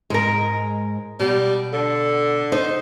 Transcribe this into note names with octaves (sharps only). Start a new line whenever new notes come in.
G#2 G#3 A#4
B2 G3
D3 A4
D#4 C5